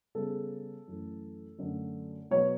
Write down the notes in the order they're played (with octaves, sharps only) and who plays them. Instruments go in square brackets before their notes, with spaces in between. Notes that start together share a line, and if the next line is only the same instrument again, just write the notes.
[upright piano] C#3 G3 B3 A4
F#2 E3 A3
F#2 D3 A3
B2 F#3 B3 C#5